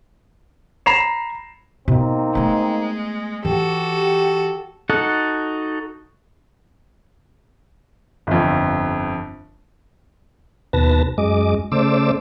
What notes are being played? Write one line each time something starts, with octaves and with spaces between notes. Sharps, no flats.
A#5 B5 C7 E7 F7
B2 A#3 C4 D#4
G#3 A3 B3
E3 F#4 G4 A4
D#4 F#4 A4 F#5
G1 F2
D#2 B2 B4 A5 A#6
F#2 G#3 D#5 D6
C#3 A3 C5 D5 D6 E6